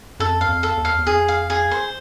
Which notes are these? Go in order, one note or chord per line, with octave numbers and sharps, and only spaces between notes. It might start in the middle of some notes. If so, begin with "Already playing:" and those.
F#2 A4
F2
F#2 F5
F2
A4
E2
F5
E2
F2 G#4
F5
G#4
C5